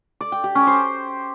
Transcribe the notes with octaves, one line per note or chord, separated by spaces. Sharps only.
D5
G5
G4
C#4
C5